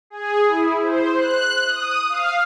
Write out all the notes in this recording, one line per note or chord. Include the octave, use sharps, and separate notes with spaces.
G#4
E4
C5
F#6
D#6
F5